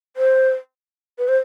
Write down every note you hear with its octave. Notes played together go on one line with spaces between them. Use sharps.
C5
B4
C5